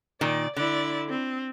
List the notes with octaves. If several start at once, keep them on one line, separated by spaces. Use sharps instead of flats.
A#2 D#3 D5
D3 E4 D5
C4